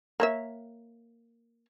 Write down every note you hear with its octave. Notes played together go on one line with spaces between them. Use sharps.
A#3 C#5 E5